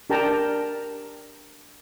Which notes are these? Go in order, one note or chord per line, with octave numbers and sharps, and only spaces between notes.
D4 G4 A#4 G5 A5 A#5